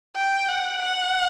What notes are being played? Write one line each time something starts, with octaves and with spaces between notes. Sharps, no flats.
G5
F#5
F#5